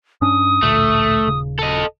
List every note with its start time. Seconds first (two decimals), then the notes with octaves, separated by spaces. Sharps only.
0.21 G2 C#4 D4 D#6
0.63 A1 D2 A#2 A3
1.25 D#1 C#3
1.59 A4 D#5